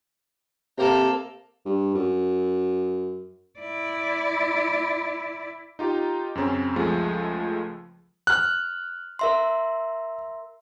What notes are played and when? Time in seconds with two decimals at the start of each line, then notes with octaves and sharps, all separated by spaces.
0.78 C3 A#3 A4
1.65 G2
1.95 F#2
3.59 E4 D5
5.79 D#4 F4 G4
6.35 F#2 C#3 C4 C#4
6.76 C#2 F3 G#3 A3
8.27 F6 F#6
9.19 A#4 E5 C6